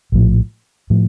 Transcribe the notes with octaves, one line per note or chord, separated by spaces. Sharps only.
A#1 A2 F3
A2 F3